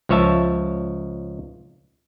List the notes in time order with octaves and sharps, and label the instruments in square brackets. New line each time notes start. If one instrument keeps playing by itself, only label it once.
[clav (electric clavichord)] C#2 F3 C#5 E5 A5